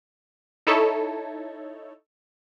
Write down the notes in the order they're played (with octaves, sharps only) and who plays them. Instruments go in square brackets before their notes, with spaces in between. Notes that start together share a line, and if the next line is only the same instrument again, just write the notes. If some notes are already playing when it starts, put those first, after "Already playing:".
[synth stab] D#4 E4 A4 C#5